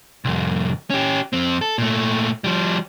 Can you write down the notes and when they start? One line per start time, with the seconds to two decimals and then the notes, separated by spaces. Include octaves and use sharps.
0.25 C2 F2
0.90 C#4 G4
1.33 F2 C4
1.61 A4
1.78 A#2 A3
2.44 F3 G3